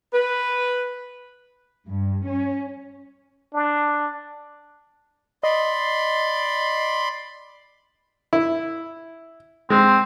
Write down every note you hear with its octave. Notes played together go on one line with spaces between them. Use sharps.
B4
G2
C#4
D4
D5 D#5 B5 C6
E4
G#3 C4